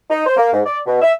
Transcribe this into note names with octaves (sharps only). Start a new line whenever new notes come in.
D#4
C5
A#3
G#2
D5
B2
E5